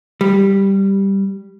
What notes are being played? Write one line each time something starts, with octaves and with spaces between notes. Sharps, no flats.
G3